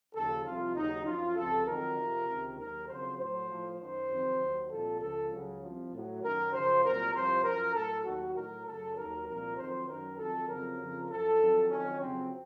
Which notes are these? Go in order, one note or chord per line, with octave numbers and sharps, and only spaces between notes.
D#2 C#3 F3 A4
C2 C3 F3 F4
D#2 C#3 F#3 D#4
F#2 F3 F4
C#2 C3 F3 A4
F2 D#3 F#3 A#4
F2 C3 F3
C#2 C3 D#3
D#2 D#3 F#3 A#4
F2 C#3 F#3 C5
A2 F#3 C5
A2 F3
F#2 D#3 F#3 C5
F2 C3 D#3 F#3
D#2 D#3 F#3
C2 A#2 F3 A4
C#2 C#3 F3 A4
C#2 C#3 F#3
C2 C3 F3
A2 F#3
F#2 D#3 F#3 A#4
F#2 C#3 F3 C5
C2 A#2 F#3 A#4
C2 C3 F3 C5
F#2 F3 A#4
A2 F#3 A4
D#2 D#3 F#3 F#4
A2 F#3 A#4
F#2 C#3 F#3 A4
D#2 D#3 F#3 A#4
C2 A#2 F3 A#4
F2 D#3 F#3 C5
F#2 D#3 F#3 A#4
F2 D#3 F#3 A4
F2 C#3 F#3 A#4
F2 C#3 F3
F#2 F3 A4
F2 D#3 F#3
F2 D#3 F#3 C#4
F2 C#3 F#3 C4